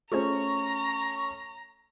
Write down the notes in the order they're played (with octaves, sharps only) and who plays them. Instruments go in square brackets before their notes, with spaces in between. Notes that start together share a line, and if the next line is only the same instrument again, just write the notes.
[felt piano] A3 C#4 [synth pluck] F4 G#4 C5 [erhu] A#5 [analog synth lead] C#6